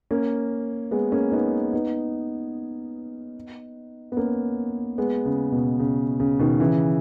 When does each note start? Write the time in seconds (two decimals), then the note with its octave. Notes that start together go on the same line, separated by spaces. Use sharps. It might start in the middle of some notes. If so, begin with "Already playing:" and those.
0.11 A#3 C#4
0.91 G#3 B3
1.12 A#3 C#4
1.32 B3 D#4
1.73 B3 D#4
4.12 B3
4.17 A#3 C#4
4.98 G#3 B3
5.25 C#3
5.52 B2
5.79 C#3
6.20 C#3
6.39 B2 D#3
6.60 C#3 E3